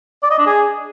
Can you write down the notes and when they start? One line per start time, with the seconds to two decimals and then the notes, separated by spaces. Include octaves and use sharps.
0.23 D5
0.31 D#5
0.38 D4
0.46 G#4